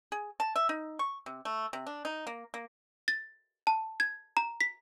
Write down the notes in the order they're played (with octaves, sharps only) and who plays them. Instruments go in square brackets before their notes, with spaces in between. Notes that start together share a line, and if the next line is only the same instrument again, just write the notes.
[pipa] G#4
A5
E5
D#4
C#6
C3
A3
C3
D4
D#4
A#3
A#3
[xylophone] A6
A5
G#6
A#5
B6